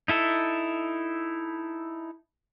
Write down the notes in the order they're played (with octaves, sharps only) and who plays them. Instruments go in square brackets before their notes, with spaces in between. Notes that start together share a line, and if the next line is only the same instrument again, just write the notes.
[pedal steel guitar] D#4 E4 A4